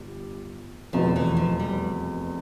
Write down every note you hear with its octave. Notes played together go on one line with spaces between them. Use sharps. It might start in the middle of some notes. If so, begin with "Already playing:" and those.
Already playing: G1 G3
F1 E2 B2 F3 B3
E3
F3
G3